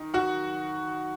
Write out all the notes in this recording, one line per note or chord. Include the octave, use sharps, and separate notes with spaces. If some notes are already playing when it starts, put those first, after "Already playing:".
Already playing: D#3
F#4 F#5